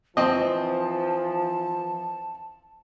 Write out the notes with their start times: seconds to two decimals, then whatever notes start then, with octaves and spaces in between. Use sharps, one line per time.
0.17 E3 F3 C4 D#5 A5